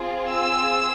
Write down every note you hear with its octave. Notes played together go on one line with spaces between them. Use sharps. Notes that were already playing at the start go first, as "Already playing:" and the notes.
Already playing: C4 F4 G#4
E6